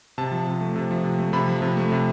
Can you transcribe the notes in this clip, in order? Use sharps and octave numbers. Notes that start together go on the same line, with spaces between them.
C3 A5
F3
C3
A3
C3
F3
C3
A3
C3 B5
F3
C3
A3
C3